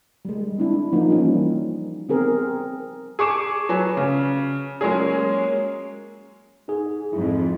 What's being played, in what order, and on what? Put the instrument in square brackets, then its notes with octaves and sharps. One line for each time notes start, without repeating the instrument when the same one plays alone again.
[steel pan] G3 G#3
C4 D4 E4
F3 A#3 D#4
E3 F3 G3 A#3 C#4
B3 C4 G#4 A#4
[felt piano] G#4 C#6 D6 E7
F#3 B4 G#5
C#3
F#3 G#3 A#3 C#4 G#4
[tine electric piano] D#4 G#4
[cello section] F2 G#2 [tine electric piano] E4